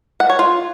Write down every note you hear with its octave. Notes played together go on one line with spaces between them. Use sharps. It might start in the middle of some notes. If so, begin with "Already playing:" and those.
F#5
C#5
F4